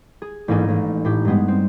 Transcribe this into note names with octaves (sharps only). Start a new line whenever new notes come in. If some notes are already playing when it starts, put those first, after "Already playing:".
G#4
A1 G#2 A#3 D4 D#4 G#5
A1
A2 G4
G2 G3 G#3 B3
C4